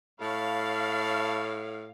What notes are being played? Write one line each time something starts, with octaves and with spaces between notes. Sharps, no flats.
A2 C#5 F5 A5 B5